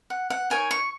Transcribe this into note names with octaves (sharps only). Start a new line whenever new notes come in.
F#5
F#5
D#4 A#4 C#5 G#5
C#6